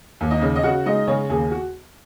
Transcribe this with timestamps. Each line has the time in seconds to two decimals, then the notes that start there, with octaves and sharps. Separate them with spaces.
0.21 D#2
0.31 D#4 D#5
0.42 C#3
0.56 D#5
0.63 C#3 F#4 F#5
0.86 G#3 D#4 D#5
1.07 C#3 C#4 C#5
1.29 D#2 G#4
1.51 F#4